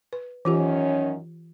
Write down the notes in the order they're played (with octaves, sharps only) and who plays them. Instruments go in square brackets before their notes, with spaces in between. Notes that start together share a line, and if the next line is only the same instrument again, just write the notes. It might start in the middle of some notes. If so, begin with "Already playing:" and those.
[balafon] B4
[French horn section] F#2 D#3 C#4 [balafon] E3 F4 G4